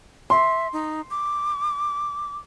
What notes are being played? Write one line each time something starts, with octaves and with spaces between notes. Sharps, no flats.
E5 C6
D#4
D6